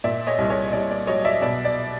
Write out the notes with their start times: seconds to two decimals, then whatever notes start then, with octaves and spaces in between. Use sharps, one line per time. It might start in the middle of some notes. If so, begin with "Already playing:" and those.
0.04 A#2 D5 E5
0.27 C#5 D#5
0.38 C2
0.50 C#5 D#5
0.73 C2 D5
0.91 D5
1.07 F#3 C#5 D#5
1.25 D5 E5
1.42 B2 D5 E5
1.65 D5